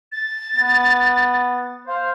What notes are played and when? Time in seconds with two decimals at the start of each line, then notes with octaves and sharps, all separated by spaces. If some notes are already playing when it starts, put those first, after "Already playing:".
0.12 A6
0.56 B3
1.87 C5 F5